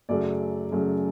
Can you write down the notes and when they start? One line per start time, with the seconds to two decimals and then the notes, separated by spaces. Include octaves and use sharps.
0.09 F#2 C#3 F#3 A3 D5
0.72 F#2 C#3 F#3 A3